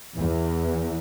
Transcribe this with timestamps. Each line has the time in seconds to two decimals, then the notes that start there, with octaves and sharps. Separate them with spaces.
0.18 E2